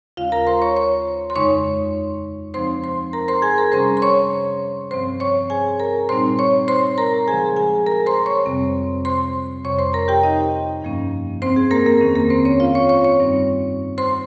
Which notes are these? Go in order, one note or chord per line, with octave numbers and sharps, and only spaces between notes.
D#2 C#3 G#3 C#4 F4 F5
A#4 A#5
C5 C6
C#5 C#6
C#5 C#6
C6
F2 C#3 G#3 D#4 C#5 C#6
C#3 F3 C4 D#4 C5 C6
C5 C6
A#4 A#5
C5 C6
G#4 G#5
A#4 A#5
C3 G3 C#4 C5 C6
C6
C#5 C#6
G2 F3 C4 C5 C6
C#5 C#6
G#4 G#5
A#4 A#5
A#2 G3 C4 D#4 C5 C6
C#5 C#6
C5 C6
A#4 A#5
C#3 F3 G#3 G#4 G#5
G#4 G#5
A#4 A#5
C5 C6
C#5 C#6
F2 C3 G3 C4
C5 C6
F2 C3 G3 C#5 C#6
C5 C6
A#4 A#5
G4 G5
D#4 D#5
G2 F3 A#3 C#4
C4 C5
G#4
A#3 A#4
A#3 A#4
F2 D#3 A#3 C#4
A#3 A#4
C4 C5
C#4 C#5
F4 F5
C#5 C#6
C#5 C#6
C#5 C#6
G2 G3 C4 D#4
C5 C6